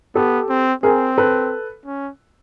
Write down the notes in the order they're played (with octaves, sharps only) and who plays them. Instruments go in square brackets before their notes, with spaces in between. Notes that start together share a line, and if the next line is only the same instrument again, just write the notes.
[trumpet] B3 [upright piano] G4 A4
[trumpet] C4
[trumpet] C4 [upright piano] G#4 A#4
[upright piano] A4 B4
[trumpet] C#4